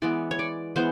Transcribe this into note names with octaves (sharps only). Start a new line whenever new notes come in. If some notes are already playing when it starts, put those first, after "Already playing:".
E3 G#3 B3 D5
C#5
D5
E3 G#3 B3 C5